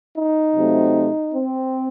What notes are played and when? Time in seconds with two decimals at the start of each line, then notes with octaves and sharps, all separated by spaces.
0.17 D#4
0.55 C3 F#3 A3 C4
1.33 C4